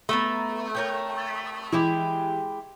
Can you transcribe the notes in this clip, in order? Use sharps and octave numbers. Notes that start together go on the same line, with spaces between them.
A3 B3 E5 A#5
A#4 C#5 G5
E3 G#3 E4 G4